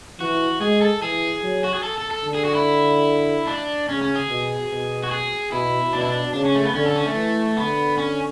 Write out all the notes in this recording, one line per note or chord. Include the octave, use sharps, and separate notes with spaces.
E3 F#4
G#3 G#4
A4
E3 G#4
F#3
F#4
G#4
A4
A4
A4
D3
G#4
F#4
E4
D4
C#3 C#4
C#4
G#4
B2
B2
F#4
G#4
B2 E4
B2 D4
E4
D4
C#3 D4
C#4
A3
B3
D3 C#4
A4
C#4
A3
E3
D3 B3
C#4